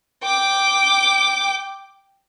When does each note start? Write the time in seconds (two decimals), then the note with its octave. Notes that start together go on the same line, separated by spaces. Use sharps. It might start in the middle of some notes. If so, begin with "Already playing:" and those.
0.23 G5 D6